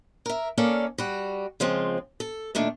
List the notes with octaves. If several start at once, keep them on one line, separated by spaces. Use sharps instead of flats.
A#4 E5
A#3 C#4 A4 D5 F5
G3 F#4
C#3 F3 G#3 C4
A4
A#2 D#3 A3 D4